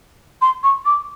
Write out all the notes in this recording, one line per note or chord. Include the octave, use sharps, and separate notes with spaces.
C6
C#6
D6